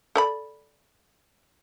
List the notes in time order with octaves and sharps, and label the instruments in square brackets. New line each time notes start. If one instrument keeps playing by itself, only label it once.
[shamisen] A4 D5 B5